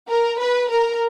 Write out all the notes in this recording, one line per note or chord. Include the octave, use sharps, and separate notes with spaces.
A#4
B4
A#4